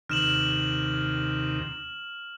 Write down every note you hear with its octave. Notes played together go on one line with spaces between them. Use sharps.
D#2 C3 D#3 F6 E7 F#7